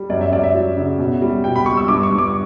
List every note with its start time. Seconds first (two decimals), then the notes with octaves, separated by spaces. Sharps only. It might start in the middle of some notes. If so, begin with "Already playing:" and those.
Already playing: G3
0.10 F#2 D5
0.21 E5
0.32 F#2 D5
0.43 E5
0.54 F#3
0.77 C#3
0.99 B2
1.22 G3
1.44 B2 G5
1.56 B5
1.66 G3 C#6
1.77 E6
1.88 G2 D6
2.03 C#6
2.11 G2
2.18 D6